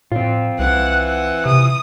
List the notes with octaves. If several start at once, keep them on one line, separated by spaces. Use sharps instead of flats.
A2 C4 F4
C2 E3 F#5
F#5
C3 D#6